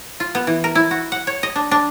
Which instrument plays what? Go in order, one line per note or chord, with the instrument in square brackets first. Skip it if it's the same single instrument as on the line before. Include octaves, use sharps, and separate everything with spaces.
[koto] F4
B3
E3
A#4
E4
F#4
F#5
C#5
D#5
D4
D4